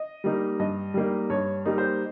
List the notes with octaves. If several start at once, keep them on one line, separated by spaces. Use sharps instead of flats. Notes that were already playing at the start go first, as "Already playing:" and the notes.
Already playing: D#5
G3 A#3 D#4
G2 D#5
G3 A#3 D#4
G2 C#5
G3 A#3 D#4
C5